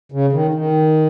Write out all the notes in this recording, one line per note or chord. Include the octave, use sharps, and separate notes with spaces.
C#3
D#3
D#3